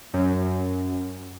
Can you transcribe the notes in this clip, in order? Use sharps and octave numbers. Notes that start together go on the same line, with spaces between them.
F#2